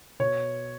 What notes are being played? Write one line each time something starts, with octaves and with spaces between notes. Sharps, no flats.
B2 C#5